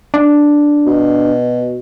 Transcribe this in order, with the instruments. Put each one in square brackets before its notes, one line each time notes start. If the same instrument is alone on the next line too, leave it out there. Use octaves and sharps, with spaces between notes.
[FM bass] D4
[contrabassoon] B2